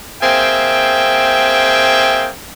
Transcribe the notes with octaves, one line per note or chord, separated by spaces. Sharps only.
A#3 C4 G#4 E5 G5